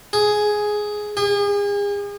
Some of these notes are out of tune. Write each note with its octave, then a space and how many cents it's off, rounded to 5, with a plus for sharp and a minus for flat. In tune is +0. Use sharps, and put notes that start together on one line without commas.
G#4 +5
G#4 -40